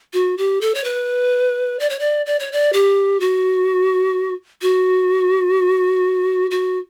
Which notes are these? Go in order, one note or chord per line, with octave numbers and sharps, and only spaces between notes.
F#4
G4
A4
C#5
B4
D5
C#5
D5
D5
C#5
D5
G4
F#4
F#4
F#4